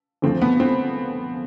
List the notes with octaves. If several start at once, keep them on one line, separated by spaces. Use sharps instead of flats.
D2 D3 F3 C4
B3
C4